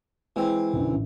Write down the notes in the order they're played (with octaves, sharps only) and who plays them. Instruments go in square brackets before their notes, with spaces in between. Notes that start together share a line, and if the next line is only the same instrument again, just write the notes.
[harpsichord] E3 C4 [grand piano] G#3
[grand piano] B1 F#2 D3
A1